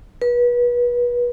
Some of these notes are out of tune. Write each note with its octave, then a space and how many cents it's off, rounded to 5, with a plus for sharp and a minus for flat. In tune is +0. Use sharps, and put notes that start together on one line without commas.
B4 -30